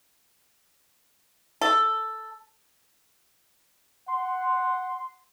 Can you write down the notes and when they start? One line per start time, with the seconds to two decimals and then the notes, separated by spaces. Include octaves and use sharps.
1.61 A4
4.08 F#5 C6